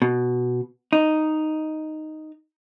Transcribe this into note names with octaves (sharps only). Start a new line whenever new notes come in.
B2
D#4